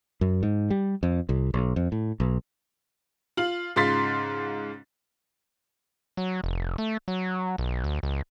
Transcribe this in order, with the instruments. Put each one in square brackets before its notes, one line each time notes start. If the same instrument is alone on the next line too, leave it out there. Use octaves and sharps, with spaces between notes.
[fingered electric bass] F#2
G#2
G3
F2
C2
B1
F2
A2
B1
[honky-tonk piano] F4 F#7
G#2 C#3 F4 C6 A6 B6
[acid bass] F#3
F1
A3
F#3
B1
D2
C#2